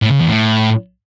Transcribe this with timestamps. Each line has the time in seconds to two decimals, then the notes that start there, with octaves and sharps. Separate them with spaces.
0.02 A2
0.11 C#3
0.19 E2
0.28 A2